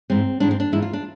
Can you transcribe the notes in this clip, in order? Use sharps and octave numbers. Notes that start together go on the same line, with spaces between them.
G#2 E3 G#3 C4
G#2 E3 G#3 D4
C4
D4
G#2 E3 G#3 E4
F4
D4